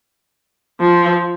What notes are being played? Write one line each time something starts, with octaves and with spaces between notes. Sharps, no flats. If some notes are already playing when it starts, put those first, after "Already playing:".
F3